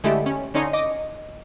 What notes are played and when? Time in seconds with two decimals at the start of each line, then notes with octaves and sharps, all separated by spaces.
0.04 D3 G#3 A3 E4 G4
0.26 C#4
0.54 D3 C#4 D#4 C6 C#7
0.73 D#5 D6